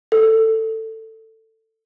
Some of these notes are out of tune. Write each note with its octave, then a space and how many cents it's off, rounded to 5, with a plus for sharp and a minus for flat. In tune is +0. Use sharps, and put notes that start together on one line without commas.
A4 +15